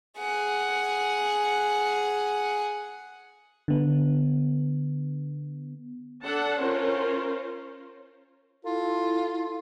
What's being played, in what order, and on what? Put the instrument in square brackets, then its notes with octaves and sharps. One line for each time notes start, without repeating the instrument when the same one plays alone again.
[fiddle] G#4 F#5
[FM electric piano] D3 B3
[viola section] D4 A4 F#5 A5
C#4 F4 A#4 C5
[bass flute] E4 [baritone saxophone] F4 [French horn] A4